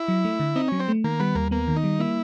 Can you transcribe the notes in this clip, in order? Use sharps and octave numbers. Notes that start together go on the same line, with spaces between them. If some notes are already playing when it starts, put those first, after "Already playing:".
Already playing: E4
F#3
A3
D3
C4 D#4
F#3 C#4
C4
A3
D#3 A#3
G3 B3
D#2 A#3
A#3 B3
D#3
D#4
G3
A#3 E4